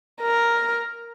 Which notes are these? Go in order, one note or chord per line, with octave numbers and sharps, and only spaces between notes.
A#4